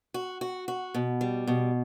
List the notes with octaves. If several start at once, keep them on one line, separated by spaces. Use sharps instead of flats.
F#4
F#4
F#4
B2
G3
B2